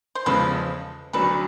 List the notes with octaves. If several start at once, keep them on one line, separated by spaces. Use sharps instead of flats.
C5
E2 C#3 F3 G#3 A4 B4
D2 D3 F#3 A3 A4 B4